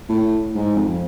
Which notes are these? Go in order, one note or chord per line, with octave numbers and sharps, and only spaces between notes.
A2
G#2
F2